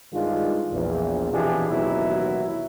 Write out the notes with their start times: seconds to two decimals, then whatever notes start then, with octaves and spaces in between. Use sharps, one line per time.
0.13 G2 D#3 G#3 D4 F4
0.72 A#1 E2
1.33 F2 B2 E3 D4 G4 G#4
1.70 A1 D#2 B2 F#3 E4